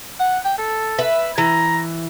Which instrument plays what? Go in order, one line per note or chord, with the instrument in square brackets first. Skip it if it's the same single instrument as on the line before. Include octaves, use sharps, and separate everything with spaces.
[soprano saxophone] F#5
G5
A4
[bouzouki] B4 E5
[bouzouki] E3 [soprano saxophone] A#5